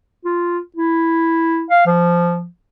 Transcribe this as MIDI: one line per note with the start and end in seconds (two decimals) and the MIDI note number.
0.25 0.58 65
0.76 1.64 64
1.70 1.85 77
1.86 2.46 53